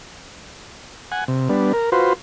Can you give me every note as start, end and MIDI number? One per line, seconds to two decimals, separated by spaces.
1.12 1.24 78
1.12 1.24 80
1.28 1.48 48
1.49 1.72 55
1.49 1.72 59
1.49 1.72 62
1.73 1.90 70
1.92 2.13 65
1.92 2.13 66
1.92 2.13 71
1.92 2.13 72